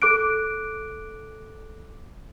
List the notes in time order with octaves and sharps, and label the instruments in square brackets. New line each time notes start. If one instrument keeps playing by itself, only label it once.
[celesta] A4 D6 F#6 D7